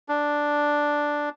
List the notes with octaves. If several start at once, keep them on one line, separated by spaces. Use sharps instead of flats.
D4